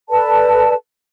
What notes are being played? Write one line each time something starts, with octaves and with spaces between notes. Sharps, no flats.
A4 B4 D5 A5